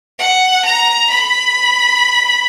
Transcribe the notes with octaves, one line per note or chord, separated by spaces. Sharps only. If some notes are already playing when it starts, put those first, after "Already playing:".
F#5
A#5
B5